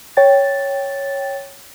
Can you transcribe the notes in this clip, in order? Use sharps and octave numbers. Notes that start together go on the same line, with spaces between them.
C#5 G5 A6